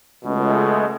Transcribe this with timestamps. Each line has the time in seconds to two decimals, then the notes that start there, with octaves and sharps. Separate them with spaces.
0.25 C#2 B2 G#3 A3